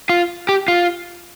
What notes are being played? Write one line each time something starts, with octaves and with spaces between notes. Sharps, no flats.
F4
G4
F4